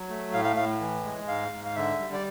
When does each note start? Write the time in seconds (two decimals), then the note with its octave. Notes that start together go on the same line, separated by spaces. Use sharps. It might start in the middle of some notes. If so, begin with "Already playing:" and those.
Already playing: F#3
0.09 A3
0.33 A2 F5
0.45 F5
0.56 A2 F5
0.80 E3
1.04 G#3
1.28 G#2 F5
1.52 G#2
1.64 F5
1.76 D3 E5
1.99 G3
2.13 D5